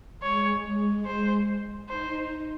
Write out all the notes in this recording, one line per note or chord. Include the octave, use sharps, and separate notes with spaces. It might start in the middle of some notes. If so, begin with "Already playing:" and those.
G#3 C#5
C5
D#4 C5